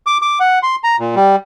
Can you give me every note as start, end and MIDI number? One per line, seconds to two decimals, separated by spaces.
0.06 0.18 86
0.22 0.39 86
0.40 0.59 78
0.63 0.76 84
0.84 0.96 82
1.00 1.15 46
1.15 1.36 55